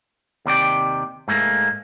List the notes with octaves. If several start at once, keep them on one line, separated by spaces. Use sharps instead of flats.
D#2 C3 D5 G5
G#2 A3 A#3